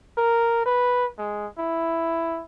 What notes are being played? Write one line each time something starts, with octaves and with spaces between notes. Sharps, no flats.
A#4
B4
G#3
E4